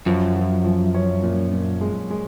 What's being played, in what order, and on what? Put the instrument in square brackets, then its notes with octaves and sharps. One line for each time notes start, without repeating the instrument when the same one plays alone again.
[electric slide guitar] F#2 [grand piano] F3
[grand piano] F3
F3
C#4
A#2
A#2
G#3
G#3